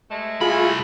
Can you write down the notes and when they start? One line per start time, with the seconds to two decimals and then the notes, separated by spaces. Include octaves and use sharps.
0.11 C3 G#3 A3
0.41 C2 F4 G#4 B5